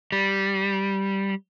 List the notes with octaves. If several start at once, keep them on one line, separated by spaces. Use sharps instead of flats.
G3